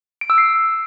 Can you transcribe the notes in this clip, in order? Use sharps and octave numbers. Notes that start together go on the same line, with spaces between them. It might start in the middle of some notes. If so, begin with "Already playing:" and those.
D7
E6
C7